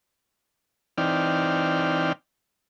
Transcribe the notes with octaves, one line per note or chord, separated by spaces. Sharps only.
E3 C4 D#4 D5 G5 F6